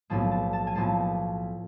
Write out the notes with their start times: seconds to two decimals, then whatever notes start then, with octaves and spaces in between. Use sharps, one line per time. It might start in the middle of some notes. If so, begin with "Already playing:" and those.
0.10 B1 A2 F3 A#3 A5
0.31 A5
0.53 A5
0.67 G#5
0.75 B1 A2 F3 A#3 A5